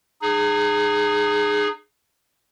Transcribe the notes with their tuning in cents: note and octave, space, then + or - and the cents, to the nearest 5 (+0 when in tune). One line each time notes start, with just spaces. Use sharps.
D#4 -35 G#4 +0